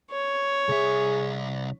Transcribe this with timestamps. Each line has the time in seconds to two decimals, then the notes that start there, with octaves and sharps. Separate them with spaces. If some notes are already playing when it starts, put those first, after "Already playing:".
0.11 C#5
0.69 C2 G#4 E5